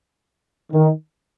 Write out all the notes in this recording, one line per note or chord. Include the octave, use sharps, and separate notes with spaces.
D#3